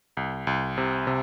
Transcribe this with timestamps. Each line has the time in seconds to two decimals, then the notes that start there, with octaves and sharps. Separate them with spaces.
0.17 C2
0.47 C2
0.78 C3
1.07 C3